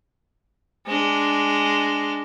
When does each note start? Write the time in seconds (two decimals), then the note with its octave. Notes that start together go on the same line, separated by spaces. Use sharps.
0.87 G#3 D4